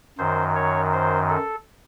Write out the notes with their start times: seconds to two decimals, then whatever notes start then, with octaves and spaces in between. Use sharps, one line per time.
0.18 F#2 D#3 C5
0.55 C#5
0.93 C5
1.30 A4